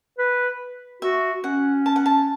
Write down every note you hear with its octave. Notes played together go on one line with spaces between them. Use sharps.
B4
F#4 E5
C#4 F#5
A5
F#5
A5